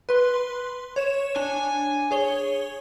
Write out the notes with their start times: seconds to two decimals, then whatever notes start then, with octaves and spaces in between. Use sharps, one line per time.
0.09 B4 C6
0.96 C#5 E7
1.36 D4 G#5
2.11 G#4 C#5 G7